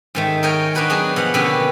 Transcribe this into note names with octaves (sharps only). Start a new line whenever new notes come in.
G#2 D#3 A3
A#4 C#5 D#5 G5 G#5 A#5
D4 D#4 F#4 B4 G5 A#5
F#3 B3 D4 G#4
B2 F3 F#5
B2 D3 A#3 B3 C#4 G4